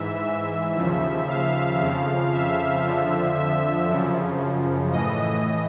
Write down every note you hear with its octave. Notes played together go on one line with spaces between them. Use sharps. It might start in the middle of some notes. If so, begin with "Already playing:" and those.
Already playing: G#2 E3 E5
E5
D#2 C#3 F3
F5
F2 C#3 F3
E5
F2 D3 F3
E5
F#2 C#3 F3
A2 E3 D#5